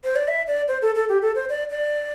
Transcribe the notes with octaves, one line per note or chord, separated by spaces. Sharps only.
C5
D5
E5
D5
C5
A4
A4
G4
A4
C5
D5
D5